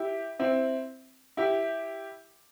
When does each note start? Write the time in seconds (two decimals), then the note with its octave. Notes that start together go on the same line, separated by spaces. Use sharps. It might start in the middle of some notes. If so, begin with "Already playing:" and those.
Already playing: E4 G4
0.39 C4 E4
1.37 E4 G4